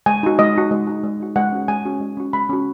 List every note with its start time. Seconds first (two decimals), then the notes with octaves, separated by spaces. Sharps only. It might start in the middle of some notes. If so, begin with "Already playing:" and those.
0.06 G#3 G#5
0.23 D#4 F#4
0.39 G#3 D#5
0.55 D#4 F#4
0.71 G#3
0.87 D#4 F#4
1.04 G#3
1.20 D#4 F#4
1.36 G#3 F#5
1.52 C#4 F#4
1.68 G#3 G#5
1.85 C#4 F#4
2.00 G#3
2.17 C#4 F#4
2.33 G#3 B5
2.49 C#4 F#4